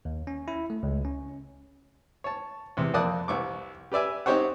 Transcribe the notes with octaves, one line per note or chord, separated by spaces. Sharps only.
D#2
C#4
E4
A3
C#2
C#4
C#5 A5
E2 C3
F2 A#3 D5 A5 D#6 F#6
C2 C#6 D6
G4 B4 D5 E5 G#5
C4 D#4 G4 C5 C#5 F#5